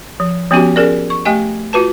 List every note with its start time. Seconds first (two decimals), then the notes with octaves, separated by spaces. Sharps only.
0.20 F3
0.51 F3 B3 C#4 F#4 G4
0.76 C#4 G#4 A#4 D5
1.10 C#6
1.25 A3 G4 D#5 G5 G#5
1.73 F4 F#4 B4 A5